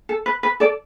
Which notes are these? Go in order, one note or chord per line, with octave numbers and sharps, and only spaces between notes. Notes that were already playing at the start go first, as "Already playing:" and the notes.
A4
B4
B4
A4 D5